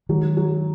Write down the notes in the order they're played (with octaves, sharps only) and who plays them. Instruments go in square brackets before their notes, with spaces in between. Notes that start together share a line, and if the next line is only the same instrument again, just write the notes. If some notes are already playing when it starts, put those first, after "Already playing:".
[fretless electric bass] D#3 G#3 [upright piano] F#3
[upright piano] F#3